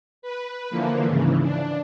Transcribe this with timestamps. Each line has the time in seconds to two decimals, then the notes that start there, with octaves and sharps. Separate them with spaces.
0.22 B4
0.70 D3 E3 F3 A#3
1.06 G#2 C#3 E3
1.42 D4